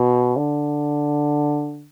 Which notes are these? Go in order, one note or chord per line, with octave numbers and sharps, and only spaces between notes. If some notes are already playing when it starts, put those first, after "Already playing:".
Already playing: B2
D3